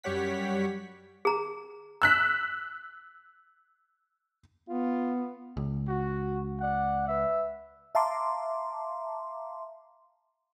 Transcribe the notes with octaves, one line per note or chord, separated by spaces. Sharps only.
F#2 G3 G4 C#5 F#5 B6
G#4 A#5
E6 F#6 B6
B3 F4
C#2
F#4
D5 F#5
B4 E5
E5 F5 A5 A#5 C6 D6